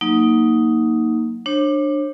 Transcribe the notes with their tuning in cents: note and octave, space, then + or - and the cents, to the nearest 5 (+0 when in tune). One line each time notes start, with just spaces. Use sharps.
F#3 +0 A#3 +0 D#4 +5
D4 +20 C#5 -40